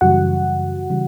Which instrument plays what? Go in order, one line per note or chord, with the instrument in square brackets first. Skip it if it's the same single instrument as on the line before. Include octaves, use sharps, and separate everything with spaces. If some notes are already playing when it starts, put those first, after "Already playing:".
[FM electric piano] F#2 C#3 E3 G3 F#4 F#5
C#3 E3 G3